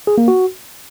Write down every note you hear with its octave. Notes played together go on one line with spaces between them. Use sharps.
G#4
A#3
F#4